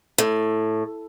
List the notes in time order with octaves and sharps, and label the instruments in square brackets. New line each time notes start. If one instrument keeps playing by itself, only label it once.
[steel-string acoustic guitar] A2